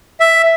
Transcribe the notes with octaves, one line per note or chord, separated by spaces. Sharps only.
E5